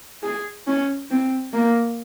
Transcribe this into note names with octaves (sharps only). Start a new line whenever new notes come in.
G#4
C#4
C4
A#3